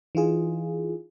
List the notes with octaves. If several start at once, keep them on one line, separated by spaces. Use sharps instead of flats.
E3 D#4 F4 G#4